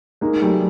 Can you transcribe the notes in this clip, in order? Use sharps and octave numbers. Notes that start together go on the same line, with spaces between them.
G#3 A#3 D#4
F#3 G3 A3